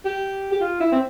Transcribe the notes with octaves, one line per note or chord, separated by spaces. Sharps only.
G4
G4
F4
E4
C4